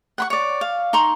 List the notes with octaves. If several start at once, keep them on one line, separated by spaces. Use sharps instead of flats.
F#5 B5 C#6
C#5 D5
F5
D#4 A#5 C6 C#6